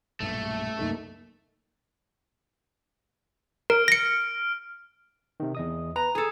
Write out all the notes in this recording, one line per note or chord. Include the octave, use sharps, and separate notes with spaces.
B1 G2 A#2 A3
C2 F#2 A#3 D#4 A4
A#4 F6 D7
A#6 C#7
C3 D#3
E2 D#5 D#6
B4 A#5
G#4 A4 D#6